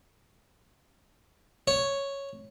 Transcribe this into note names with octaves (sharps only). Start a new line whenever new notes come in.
C#5